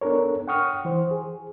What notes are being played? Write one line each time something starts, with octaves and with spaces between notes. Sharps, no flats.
B3 D4 A4 A#4 C#5
F#5 G5 C#6 D#6 F6
E3 C5
G#4